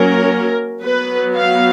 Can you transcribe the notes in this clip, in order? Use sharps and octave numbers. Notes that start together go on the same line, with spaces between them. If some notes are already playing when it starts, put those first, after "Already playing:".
Already playing: F#3 A#3 C#4 A#4
F#3 B3 B4
F5